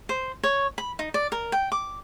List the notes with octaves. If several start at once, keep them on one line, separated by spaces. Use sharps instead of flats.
C5
C#5
B5
D#4
D5
A#4
G5
D6